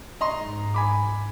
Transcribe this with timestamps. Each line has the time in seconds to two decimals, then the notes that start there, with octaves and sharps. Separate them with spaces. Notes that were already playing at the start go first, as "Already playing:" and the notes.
0.21 G#2 D#5 A#5 C6
0.74 G#5 B5 D6